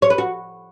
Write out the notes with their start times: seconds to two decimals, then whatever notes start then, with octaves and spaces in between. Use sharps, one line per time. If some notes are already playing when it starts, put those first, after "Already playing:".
0.02 C#5
0.10 B4
0.18 F#4